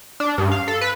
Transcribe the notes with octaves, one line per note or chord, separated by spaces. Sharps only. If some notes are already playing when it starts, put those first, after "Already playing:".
D4
G2
F5
A4
B4